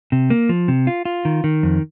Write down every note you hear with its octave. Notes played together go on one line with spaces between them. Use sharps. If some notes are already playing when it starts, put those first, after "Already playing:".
C3
A#3
F3
C3
F4
F4
D#3
D#3
F2